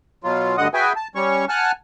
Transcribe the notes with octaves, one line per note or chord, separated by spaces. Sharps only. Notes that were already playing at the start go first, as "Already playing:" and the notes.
B2 F#3 F4
D2 G2 D3 D#5 F#5 D#6
F#4 G#4 B4 E5 G5 G#5
A5
G3 C#4 C#5 C#6
F#5 G#5 A5 F6 F#6